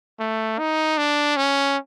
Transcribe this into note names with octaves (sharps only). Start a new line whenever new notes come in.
A3
D#4
D4
C#4